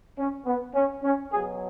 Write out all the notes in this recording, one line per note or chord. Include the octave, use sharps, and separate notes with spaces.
C#4
B3
C#4
C#4
B2 F#3 G#4